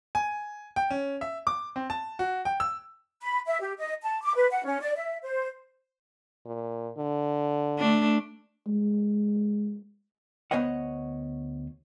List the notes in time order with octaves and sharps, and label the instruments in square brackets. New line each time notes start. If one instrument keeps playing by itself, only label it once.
[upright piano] G#5
G5
C#4
E5
D6
C4
A5
F#4
G5
E6
[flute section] B5
E5
G4
D#5
A5
D6
B4
F#5
C#4
D5
E5
C5
[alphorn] A#2
D3
[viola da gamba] A3 D4
[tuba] G#3
[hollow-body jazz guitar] D2 B3 C5 C#5 D#5 F#5